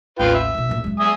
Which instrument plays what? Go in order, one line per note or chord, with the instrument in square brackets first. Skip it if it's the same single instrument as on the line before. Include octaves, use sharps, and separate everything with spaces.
[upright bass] A1 D#2 [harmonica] F4 B4 G5
[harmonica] E5
[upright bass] B2 D#3
G1 A#2
F#3 G#3
[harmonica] E5 G#5 D#6